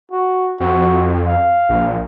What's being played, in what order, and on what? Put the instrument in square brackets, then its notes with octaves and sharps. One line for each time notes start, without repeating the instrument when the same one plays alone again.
[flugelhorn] F#4
[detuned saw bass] F2 [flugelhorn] F#4
[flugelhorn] F5
[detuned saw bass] A#1